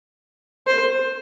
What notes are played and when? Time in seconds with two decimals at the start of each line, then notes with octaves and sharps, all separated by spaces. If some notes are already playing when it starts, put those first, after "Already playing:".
0.67 C5